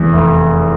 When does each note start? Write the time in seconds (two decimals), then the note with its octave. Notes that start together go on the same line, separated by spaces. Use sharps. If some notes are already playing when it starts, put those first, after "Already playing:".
Already playing: F1 E2
0.13 F1